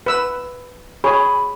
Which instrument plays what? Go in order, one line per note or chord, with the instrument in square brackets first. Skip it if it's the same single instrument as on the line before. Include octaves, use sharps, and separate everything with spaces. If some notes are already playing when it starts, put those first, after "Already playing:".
[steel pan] B4 E6
[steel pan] G#4 C#5 [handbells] B5